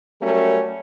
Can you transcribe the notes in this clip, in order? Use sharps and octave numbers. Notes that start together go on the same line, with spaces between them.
F#3 G3 A3 C#4 A#4